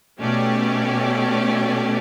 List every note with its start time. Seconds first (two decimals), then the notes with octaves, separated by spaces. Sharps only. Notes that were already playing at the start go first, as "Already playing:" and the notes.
0.20 B2 A3 C#4 G4 D5